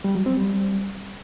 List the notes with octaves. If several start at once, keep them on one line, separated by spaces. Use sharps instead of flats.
G3
F#3
C4
G3